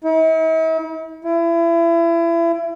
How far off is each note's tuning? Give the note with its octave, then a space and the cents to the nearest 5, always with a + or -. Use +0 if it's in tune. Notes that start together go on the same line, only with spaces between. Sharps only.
E4 -45
E4 +30